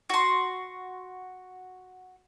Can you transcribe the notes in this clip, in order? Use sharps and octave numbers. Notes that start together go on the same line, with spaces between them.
F#4 C6